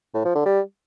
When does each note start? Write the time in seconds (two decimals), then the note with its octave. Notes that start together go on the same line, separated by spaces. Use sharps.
0.14 A2
0.25 F3
0.35 D3
0.46 G3